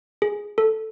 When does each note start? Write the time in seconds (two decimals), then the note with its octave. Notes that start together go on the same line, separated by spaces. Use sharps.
0.22 G#4
0.58 A4